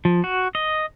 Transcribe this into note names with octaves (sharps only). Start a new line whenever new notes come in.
F3
F#4
D#5